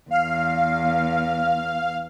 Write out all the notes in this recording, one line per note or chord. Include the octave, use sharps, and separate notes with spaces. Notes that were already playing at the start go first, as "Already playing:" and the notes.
E2 F5